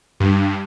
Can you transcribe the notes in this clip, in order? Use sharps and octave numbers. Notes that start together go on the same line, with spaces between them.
G2